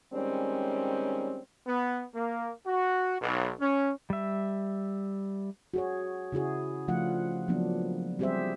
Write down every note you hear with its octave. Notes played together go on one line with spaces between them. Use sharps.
D#3 G3 G#3 C4 C#4
B3
A#3
F#4
B1
C#4
G3 E5
F#4 G#4 C#5
C#3 E4 F#4 G#4
C#3 F3 A3 D4 F4 F#5
F3 F#3 A#3 B3 D4
G3 C4 G4 G#4 C5 E5